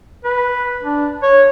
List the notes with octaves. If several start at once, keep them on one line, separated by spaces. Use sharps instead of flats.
B4
D4
C#5